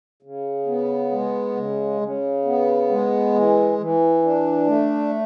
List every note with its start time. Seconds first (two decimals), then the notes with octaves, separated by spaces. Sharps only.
0.23 C#3
0.67 B3
1.12 G#3
1.55 C#3
2.01 C#3
2.45 B3
2.89 G#3
3.34 E3
3.78 E3
4.23 D4
4.67 A3